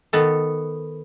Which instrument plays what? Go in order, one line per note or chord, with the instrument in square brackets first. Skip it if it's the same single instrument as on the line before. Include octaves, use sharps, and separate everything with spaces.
[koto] D#3 B3 A4